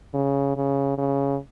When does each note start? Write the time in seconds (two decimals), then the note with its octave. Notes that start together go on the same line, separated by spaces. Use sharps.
0.14 C#3
0.56 C#3
0.98 C#3